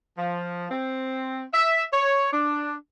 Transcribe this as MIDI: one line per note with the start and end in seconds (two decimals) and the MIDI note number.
0.18 0.68 53
0.71 1.43 60
1.54 1.83 76
1.92 2.32 73
2.33 2.74 62